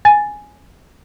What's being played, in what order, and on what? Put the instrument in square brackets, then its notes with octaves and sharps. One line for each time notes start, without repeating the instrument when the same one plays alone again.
[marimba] G#5 A6